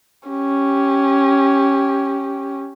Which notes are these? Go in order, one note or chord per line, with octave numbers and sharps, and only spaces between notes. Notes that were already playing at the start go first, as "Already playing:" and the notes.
C#4 G4